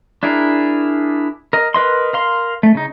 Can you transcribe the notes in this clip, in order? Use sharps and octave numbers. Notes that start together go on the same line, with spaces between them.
D4 E4 G#4 A#4
A#4 D#5
A#4 B4 D#5 C6
A#4 F5 C6
A3
C#3 D#4